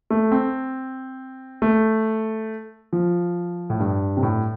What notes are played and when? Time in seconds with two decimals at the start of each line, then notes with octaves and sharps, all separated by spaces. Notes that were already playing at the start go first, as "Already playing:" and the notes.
0.10 A3
0.32 C4
1.62 A3
2.93 F3
3.70 A2
3.80 G2
4.17 C3
4.23 A2